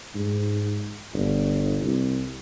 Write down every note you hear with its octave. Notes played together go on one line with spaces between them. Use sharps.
G#2
G1
C2